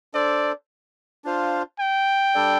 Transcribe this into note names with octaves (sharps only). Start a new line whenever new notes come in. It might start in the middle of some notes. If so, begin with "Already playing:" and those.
D4 A4 C5 D5
D4 F4 C5 F5
G5
G3 D4 A4 D5